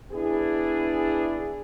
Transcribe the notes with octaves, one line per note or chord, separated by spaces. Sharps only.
B3 D4 E4 G#4